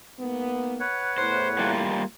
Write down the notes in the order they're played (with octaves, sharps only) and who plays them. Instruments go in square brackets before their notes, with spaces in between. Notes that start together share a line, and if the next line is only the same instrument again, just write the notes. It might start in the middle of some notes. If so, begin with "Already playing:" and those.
[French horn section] G#2 A#3 B3
[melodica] B4 C#5 F#5
[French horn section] E2 A2 [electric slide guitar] C5
[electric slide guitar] G3 A#3 F4